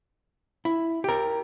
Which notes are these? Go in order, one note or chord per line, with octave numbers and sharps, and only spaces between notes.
E4
G4 A#4